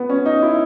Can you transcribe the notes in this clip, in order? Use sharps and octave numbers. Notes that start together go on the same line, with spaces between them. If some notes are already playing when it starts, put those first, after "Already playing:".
Already playing: B3
C#4
D#4
E4